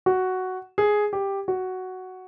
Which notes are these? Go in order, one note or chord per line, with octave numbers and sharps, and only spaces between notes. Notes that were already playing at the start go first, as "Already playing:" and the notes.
F#4
G#4
G4
F#4